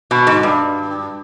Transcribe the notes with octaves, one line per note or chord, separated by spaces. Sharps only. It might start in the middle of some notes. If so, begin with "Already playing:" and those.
B2
G#2
G2